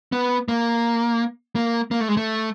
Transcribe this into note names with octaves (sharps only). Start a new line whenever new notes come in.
B3
A#3
A#3
A#3
A3
G#3
A3